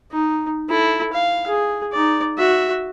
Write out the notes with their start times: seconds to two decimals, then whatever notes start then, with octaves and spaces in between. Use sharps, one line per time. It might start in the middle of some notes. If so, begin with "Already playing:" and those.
0.11 D#4
0.70 E4 A4
1.13 F5
1.47 G#4
1.93 D#4 D5
2.38 F#4 E5